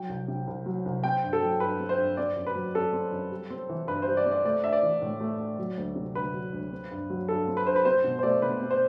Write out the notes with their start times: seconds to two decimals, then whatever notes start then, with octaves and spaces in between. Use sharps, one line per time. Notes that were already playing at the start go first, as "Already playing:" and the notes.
Already playing: F#3 G5
0.09 C2
0.28 C3
0.47 C2
0.66 F#3
0.86 C2
1.04 C4 G5
1.23 G2
1.33 A4
1.43 F#3
1.60 G2 B4
1.80 C4
1.89 C5
1.98 G2
2.17 C4 D5
2.36 F#2
2.47 B4
2.55 F#3
2.75 F#2 A4
2.93 C4
3.12 F#2
3.31 G3
3.50 C4
3.69 E3
3.87 G2 B4
4.02 G3 C5
4.17 D5
4.25 C4
4.31 D5
4.45 A3 D5
4.64 D4 E5
4.73 D5
4.82 E3
5.02 A2
5.20 A3
5.40 D4
5.59 F#3
5.77 D2
5.96 C3
6.15 D2 B4
6.33 F#3
6.52 D2
6.72 C4
6.91 G2
7.10 F#3
7.29 G2 A4
7.48 C4
7.57 B4
7.67 G2 C5
7.76 B4
7.85 C4 C5
8.04 B2
8.19 C5
8.23 A3 D5
8.42 B2 B4
8.61 C4
8.71 C5